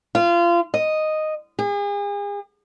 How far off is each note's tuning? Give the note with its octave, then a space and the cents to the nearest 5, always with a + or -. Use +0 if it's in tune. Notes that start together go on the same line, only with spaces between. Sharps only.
F4 -25
D#5 -5
G#4 -40